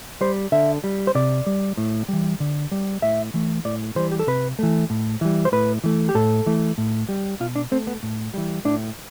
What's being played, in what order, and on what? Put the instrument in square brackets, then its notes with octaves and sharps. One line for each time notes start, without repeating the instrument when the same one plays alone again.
[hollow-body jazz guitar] G3 C5
D3 E5
G3
C5
C3 D5
G3
A2
E3 G3
D3
G3
A2 E5
E3 A3
A2 D5
E3 G3 C5
G4
A4
C3 B4
E3 A3
A2
E3 G3
C5
A2 B4
E3 A3
G4
A2 A4
E3 A3
A2
G3
B2 F4
D4
A3 C4
B3
A2
E3 G3
A2 D4